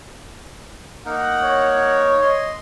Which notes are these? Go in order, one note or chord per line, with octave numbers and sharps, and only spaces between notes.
A#3 D#4 A#4 F#5
C#5
D#5 C6